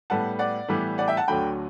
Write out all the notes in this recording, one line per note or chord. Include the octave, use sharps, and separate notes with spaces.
A2 G3 B3 F#5 A5
D5 F#5
A2 E3 G3 B3
D5 F#5
E5 G5
F#5 A5
D2 D3 F#3 A3 G5 B5